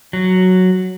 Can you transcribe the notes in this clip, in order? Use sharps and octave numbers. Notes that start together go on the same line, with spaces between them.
F#3